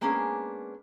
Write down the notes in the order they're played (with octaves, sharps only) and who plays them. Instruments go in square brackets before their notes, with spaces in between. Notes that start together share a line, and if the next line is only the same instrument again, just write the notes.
[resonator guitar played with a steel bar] G#3 A#3 B3 C#4 D4 G#4